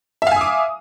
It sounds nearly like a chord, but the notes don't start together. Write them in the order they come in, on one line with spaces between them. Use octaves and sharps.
E5 F5 G#5 D#6 D6